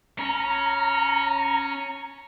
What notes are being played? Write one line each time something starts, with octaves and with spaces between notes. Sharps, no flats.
C#4 A#5